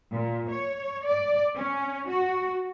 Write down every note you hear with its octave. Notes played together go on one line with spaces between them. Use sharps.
A#2
C#5
D5
C#4
F#4